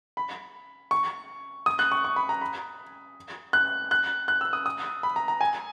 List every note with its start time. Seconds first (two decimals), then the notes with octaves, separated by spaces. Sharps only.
0.17 B5
0.91 C#6
1.66 D#6
1.79 F#6
1.92 C#6
2.04 C#6
2.16 B5
2.29 A#5
2.41 B5
3.53 F#6
3.91 F#6
4.28 F#6
4.41 E6
4.53 D#6
4.66 D#6
5.03 B5
5.16 A#5
5.28 A#5
5.41 G#5